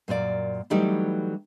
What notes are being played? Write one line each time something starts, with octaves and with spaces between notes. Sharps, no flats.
F#2 A#2 G4 D5
E3 F#3 G3 A3 D#4 G4